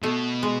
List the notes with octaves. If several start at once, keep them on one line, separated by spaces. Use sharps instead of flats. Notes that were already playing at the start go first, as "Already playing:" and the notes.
B2 A3
G#3